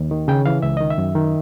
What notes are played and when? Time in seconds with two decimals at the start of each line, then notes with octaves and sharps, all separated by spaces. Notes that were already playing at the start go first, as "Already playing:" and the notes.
Already playing: D#2
0.11 D#3
0.28 C#3 G5
0.46 E3 F5
0.62 C#2 E5
0.77 D#3 D#5
0.90 E5
0.98 F#2
1.15 D#3